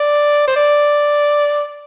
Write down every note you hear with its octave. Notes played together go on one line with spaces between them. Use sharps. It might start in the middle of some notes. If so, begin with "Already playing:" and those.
Already playing: D5
C5
D5